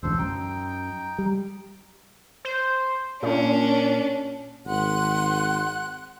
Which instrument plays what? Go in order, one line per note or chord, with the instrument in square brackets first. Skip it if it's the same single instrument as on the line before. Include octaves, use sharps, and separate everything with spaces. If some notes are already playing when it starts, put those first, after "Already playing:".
[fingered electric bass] E1 A1 D2 [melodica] A4 C5
[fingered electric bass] F#2 [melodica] D#4 G5
[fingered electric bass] G3
[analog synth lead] C5
[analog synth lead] A#2 [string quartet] C#4 D4
[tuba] G#1 [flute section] F#5 C6 F#6